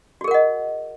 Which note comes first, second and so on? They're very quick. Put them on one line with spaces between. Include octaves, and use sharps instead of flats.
F#4 G#4 A#4 F#5 D#5